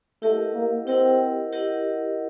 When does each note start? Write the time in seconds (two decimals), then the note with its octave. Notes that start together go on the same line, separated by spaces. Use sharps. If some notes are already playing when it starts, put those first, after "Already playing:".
0.22 A3 E4 G4 A#4 D#5 F#5
0.54 A#3
0.87 C4 E4 G4 A#4 D#5 F#5
1.53 E4 G4 A#4 D#5 F#5